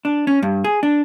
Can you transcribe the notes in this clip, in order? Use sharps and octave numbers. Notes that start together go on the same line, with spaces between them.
D4
C#4
G2
G#4
D4